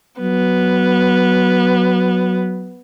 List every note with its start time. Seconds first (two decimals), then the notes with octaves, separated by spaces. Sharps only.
0.21 F#3 B3